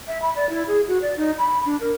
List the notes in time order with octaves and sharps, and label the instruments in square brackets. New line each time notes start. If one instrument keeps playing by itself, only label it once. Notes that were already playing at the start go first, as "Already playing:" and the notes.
[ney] E5
B5
D5
E4
G#4
F#4
D5
D#4
B5
D4
A#4